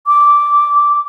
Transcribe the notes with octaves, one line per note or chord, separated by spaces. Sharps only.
D6